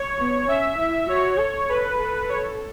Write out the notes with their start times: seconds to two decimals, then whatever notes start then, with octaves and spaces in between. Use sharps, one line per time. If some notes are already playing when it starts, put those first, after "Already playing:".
Already playing: C#5
0.18 B3
0.48 C#4 E5
0.79 E4
1.09 F#4 C#5
1.39 A4
1.69 A4 B4
1.99 A4
2.29 C#5